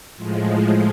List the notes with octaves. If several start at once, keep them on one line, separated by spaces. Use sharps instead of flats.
A2 F3 G#3